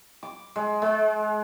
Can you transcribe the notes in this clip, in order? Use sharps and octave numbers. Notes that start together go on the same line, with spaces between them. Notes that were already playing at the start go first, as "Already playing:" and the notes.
D6
G#3
G#3